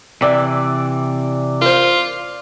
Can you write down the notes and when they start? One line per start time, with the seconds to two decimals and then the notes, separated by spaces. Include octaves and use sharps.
0.22 C3 E3 D5
1.61 F4 A#4 C5